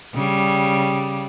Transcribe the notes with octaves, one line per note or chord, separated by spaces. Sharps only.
C#3 G3